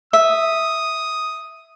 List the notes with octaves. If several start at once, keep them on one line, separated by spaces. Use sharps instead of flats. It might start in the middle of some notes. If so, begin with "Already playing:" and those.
E5 D#6